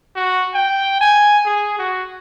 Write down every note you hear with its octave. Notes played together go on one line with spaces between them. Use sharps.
F#4
G5
G#5
G#4
F#4